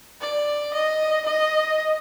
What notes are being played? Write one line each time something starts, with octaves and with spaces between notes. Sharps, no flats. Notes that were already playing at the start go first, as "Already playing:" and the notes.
D5
D#5
D#5